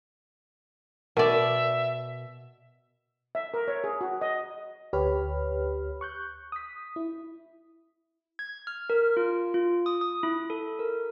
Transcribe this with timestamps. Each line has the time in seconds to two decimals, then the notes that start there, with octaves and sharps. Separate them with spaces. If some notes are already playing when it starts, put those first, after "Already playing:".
1.17 B2 A#4 D5 E5
3.35 E5
3.54 A#4
3.68 C#5
3.84 G#4
4.01 F#4
4.21 D#5
4.93 D2 G4 B4 C#5 B5 F6
6.01 C#6 F#6 G6
6.52 D#6 B6
6.96 E4
8.39 G#6
8.67 F6
8.90 A#4
9.17 F4
9.54 F4
9.86 D#6
10.01 D#6
10.23 E4
10.50 A4
10.79 A#4